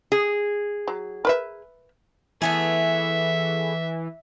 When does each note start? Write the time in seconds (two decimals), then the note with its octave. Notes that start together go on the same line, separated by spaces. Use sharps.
0.12 G#4
0.88 F#3
1.25 A#4 B4 E5
2.42 E3 A3 B3 G#4 E5